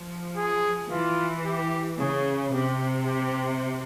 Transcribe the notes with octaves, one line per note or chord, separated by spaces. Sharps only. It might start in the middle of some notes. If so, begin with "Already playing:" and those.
Already playing: F3
G#4
E3 F4
G4
C#3 G#4
C3 G4
G4